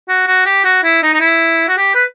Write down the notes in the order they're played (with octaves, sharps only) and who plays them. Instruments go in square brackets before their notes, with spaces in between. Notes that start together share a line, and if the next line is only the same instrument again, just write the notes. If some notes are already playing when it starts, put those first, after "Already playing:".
[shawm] F#4
F#4
G4
F#4
E4
D#4
D#4
E4
F#4
G4
B4